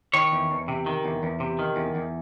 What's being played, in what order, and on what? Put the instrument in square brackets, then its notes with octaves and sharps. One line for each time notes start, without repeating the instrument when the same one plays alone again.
[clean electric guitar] D#3 C#5
E2
E2
C3
D#3
E2
E2
C3
D#3
E2
E2